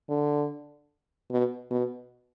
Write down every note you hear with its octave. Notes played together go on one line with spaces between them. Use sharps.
D3
B2
B2